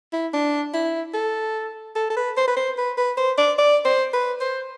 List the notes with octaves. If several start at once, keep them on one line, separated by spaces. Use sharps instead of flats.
E4
D4
E4
A4
A4
A4
B4
C5
B4
C5
B4
B4
C5
D5
D5
C5
B4
C5